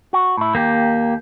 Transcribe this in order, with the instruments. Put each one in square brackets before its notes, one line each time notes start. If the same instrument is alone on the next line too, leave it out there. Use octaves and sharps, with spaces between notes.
[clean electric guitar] F#4
A2 E4
[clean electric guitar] D#2 [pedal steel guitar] A#3 G4